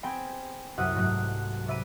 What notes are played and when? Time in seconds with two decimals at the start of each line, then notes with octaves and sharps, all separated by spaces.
0.03 C4 G#4 C5 G5 G#5 B5
0.78 C2 F#2 E5 F#5 D#6
0.95 G#2 F#3 A3 F#6
1.67 C3 D5 E5 B5 D#7